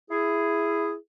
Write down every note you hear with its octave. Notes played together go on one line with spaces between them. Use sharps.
E4 G#4